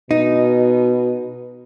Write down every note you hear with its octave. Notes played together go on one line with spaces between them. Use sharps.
B2 D#4